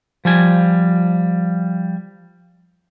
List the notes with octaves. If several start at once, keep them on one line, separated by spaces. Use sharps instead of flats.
F3 G3 G#5